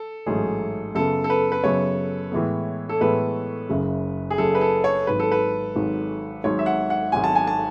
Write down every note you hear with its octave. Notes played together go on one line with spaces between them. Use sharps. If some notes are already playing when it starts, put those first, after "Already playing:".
Already playing: A4
A1 G#2 F#3 A3 D#4 G#4
F#2 C#3 F#3 B3 A4
A4
B4
B4
F#2 C#3 F#3 B3 C#5
A2 E3 G#3 B3
A4
A2 E3 G#3 B3 B4
F#1 F#2 C#3
G#4
F#1 F#2 C#3 A4
B4
A4
C#5
G#1 G#2 F#3 B4
A4
B4
G#1 G#2 F#3
G#1 G#2 F#3 C#5
E5
F#5
F#5
G#1 G#2 F#3 G#5
A5
G#5
A5